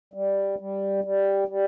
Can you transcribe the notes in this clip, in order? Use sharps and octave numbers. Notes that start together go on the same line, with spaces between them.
G3
G3
G3
G3